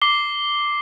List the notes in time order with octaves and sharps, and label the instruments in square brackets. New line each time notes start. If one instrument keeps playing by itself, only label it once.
[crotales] D6 C7 G7